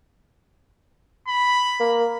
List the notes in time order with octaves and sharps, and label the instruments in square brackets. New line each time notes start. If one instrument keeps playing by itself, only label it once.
[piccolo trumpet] B5
[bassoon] A#3